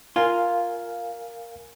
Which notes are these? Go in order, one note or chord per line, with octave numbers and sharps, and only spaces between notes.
F4 A#4 F5 G#5